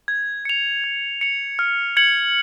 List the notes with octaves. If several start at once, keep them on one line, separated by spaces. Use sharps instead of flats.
G#6
C#7 F7
G#6
C#7 F7
F6
G#6 C#7 F#7